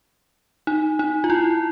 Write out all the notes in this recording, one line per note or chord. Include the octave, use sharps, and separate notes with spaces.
D#4
D#4
F4
E4